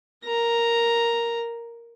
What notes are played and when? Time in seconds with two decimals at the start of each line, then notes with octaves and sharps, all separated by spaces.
0.25 A#4 A#5